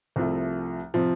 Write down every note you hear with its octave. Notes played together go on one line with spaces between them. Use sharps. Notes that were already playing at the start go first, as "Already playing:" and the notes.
C2 C3 F3 A3
C3 F3